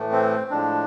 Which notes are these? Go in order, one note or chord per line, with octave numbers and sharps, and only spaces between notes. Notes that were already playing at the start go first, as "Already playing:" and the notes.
Already playing: A2 E3 A3
C4
A2 F3 G#3 D4